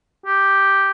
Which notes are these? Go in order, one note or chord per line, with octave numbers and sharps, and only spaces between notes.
G4